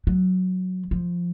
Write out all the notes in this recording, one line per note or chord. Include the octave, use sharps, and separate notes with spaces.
F#3
F3